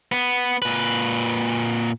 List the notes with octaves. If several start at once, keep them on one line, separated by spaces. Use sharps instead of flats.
B3
A#2 B4